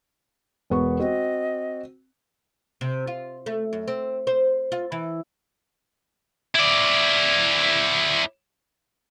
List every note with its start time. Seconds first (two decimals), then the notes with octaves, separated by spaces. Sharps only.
0.70 E1 B3 C#6
1.00 C4 F#4 D#5
2.81 C3
3.07 F4
3.46 A3
3.73 F#2
3.88 C4
4.27 C5
4.72 F4
4.92 E3
6.55 E4 D5